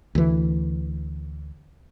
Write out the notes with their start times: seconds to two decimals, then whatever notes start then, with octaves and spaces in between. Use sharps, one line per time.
0.15 D2 E3